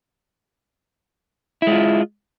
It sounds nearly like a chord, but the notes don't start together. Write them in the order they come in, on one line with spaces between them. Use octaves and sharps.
E4 G#3 F4